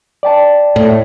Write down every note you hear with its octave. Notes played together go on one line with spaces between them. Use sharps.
D5 G5 A5
A2